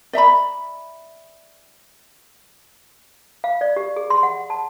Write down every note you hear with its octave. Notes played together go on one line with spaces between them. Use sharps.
D5 E5 A#5 B5
F5
D5
G4
G#4
C6
F#5
A5